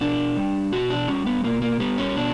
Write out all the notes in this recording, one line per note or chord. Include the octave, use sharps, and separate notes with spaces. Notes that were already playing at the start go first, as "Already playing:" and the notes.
B2 D4
G3
B2 F#4
D4
G3 C#4
B3
B2 A#3
A#3
G3 B3
C#4
B2 D4